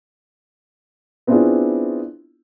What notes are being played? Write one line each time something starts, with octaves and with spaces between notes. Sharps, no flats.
B3 C4 D4 E4 F4 G#4